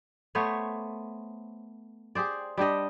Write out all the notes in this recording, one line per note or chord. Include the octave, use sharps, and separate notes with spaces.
A3 B3 C5 C#5
G4 G#4 C5 D5
G3 D4 G4 D#5